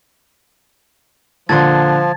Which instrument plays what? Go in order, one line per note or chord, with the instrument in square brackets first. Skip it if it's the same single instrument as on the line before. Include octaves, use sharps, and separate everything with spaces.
[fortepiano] A#2 D3 C6 [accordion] F3 [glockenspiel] A5 G#6 A6